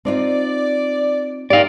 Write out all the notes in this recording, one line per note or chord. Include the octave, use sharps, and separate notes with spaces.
C4 D#4 F4 D5
D#4 G4 D5 F5